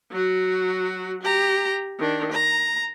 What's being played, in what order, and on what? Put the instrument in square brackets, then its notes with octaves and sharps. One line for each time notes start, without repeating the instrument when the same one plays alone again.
[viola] F#3 F#4
G4 A#5
D#3 D4
A#5